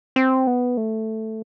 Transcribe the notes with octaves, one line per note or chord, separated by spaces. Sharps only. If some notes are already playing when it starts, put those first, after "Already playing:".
C4
B3
A3